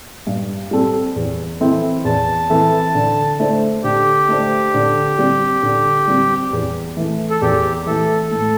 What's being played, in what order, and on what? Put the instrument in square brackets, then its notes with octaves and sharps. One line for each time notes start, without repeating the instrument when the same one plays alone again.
[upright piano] G2
G3 C4 A4
E2
E3 C4 E4 A4
[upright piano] E2 [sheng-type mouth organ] A5
[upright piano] E3 C4 E4 A4
D3
A3 D4 C5
[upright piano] D3 [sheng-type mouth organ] G4
[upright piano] A3 D4 C5
D3
G3 C4
D3
G3 C4
E2
E3 A3
[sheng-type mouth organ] A4
[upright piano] E2 [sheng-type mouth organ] G4
[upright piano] E3 A3 [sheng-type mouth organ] A4
[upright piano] A2 [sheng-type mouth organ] A4